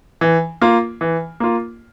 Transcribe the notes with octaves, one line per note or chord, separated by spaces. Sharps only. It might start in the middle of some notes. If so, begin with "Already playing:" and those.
E3
A#3 F4
E3
A#3 F4